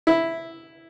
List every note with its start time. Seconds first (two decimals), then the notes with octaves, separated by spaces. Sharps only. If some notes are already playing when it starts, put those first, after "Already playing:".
0.07 E4